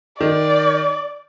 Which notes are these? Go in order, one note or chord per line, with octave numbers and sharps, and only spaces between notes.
D#3 D5